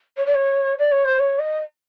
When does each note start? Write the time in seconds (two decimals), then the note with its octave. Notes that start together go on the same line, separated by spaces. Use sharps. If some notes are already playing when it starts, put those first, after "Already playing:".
0.17 C#5
0.26 D5
0.34 C#5
0.79 D5
0.92 C#5
1.05 C5
1.19 C#5
1.39 D#5